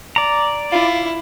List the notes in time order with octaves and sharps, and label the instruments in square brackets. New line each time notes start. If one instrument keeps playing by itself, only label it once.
[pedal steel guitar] D5 A#5
[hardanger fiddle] E4 [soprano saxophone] F4